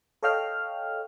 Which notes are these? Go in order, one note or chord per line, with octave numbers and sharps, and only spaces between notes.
A4 C#5 D#5 F5 G5 F6